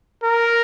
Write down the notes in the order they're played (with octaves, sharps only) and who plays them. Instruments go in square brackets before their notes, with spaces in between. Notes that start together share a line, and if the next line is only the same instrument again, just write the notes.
[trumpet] A#4